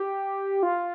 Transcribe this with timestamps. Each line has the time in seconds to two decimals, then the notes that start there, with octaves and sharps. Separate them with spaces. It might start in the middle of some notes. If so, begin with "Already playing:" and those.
Already playing: G4
0.63 F4